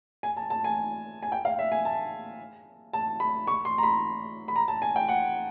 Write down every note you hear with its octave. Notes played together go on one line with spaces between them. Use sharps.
G#5
A5
A5
G#5
G#5
G5
F5
E5
G#5
A5
A5
B5
C#6
C6
A#5
B5
B5
A#5
A5
G#5
G5
F#5